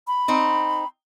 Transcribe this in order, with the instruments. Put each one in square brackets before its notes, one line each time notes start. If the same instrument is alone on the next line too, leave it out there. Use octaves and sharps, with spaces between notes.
[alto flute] B5
[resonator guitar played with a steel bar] C4 D#4